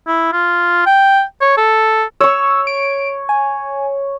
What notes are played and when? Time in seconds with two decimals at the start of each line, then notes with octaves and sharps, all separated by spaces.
0.07 E4
0.33 F4
0.86 G5
1.41 C#5
1.57 A4
2.21 C#5 C#6 E6
2.67 D7
3.29 G#5